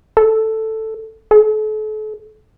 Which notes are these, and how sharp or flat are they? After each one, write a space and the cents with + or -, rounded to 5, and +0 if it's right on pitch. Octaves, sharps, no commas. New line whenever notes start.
A4 +5
A4 -40